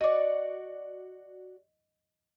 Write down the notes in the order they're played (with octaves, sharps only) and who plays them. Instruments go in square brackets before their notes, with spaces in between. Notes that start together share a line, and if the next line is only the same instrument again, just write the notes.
[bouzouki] F#4 D5 [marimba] D#5 D6